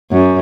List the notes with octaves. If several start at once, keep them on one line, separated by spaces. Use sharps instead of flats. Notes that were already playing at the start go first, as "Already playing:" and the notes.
F#2